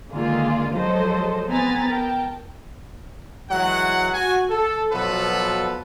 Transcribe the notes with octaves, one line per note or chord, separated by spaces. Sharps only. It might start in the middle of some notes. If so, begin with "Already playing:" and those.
D3 D#3 G#3 A#3 F4 G#4
F3 F#3 G#3 A4 C5 D#5
B3 C4 G#5 A#5 A6
A#4 G5 A5
E3 F#3 G#3 F#5
F#4 G#5
A4
B2 F3 F#3 F4 A4 B4